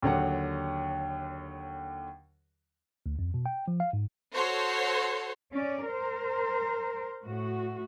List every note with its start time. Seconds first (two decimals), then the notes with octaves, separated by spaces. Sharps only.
0.02 D#2 D3 F#3 F#5
3.06 D2
3.19 F2
3.34 B2
3.46 G5
3.68 F3
3.80 F5
3.93 G#2
4.34 F#4 A4 C5 C#5 C6
5.53 C#4 D5
5.86 A#4 C5
7.25 A2 F#4